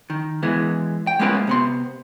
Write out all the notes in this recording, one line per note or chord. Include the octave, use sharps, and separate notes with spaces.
D#3
E3 G#3 B3
G5
G#3 A#3 B3 C#4 F4 B4
C3 B3 C6